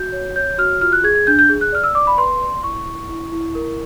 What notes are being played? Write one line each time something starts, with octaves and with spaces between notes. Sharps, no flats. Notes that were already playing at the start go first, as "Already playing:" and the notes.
Already playing: F#4 G6
C#5
C#5 G6
F#4 F6
F4 F6
F#6
G#4 G#6
G#6
D4 G6
G6
G#4
F#6
D5 F6
E6
D5 D6
B5
B4 C6
D5
E4 C#6
E4
E4
E4
A#4